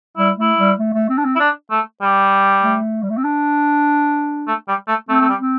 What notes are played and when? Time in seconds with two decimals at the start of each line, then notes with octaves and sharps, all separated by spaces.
0.17 G3 E4
0.38 A3 E4
0.58 G3
0.79 A3
0.94 A3
1.09 C4
1.18 D4
1.25 C4
1.36 E4
1.40 D4
1.71 A3
2.02 G3
2.63 A3
3.03 G3
3.10 A3
3.18 C4
3.24 D4
4.48 A3
4.68 G3
4.88 A3
5.09 A3 C4
5.20 A3
5.29 G3
5.39 C4